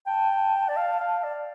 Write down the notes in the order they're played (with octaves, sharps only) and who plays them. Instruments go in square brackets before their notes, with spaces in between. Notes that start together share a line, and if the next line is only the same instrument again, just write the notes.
[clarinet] G5 [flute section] A5
[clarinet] D5
F5
F5
D5